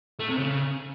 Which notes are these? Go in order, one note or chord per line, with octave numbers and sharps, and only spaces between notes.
A3
C3
C#3